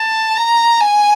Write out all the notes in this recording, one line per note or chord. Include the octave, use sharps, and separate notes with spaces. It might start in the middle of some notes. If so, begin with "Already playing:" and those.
Already playing: A5
A#5
G#5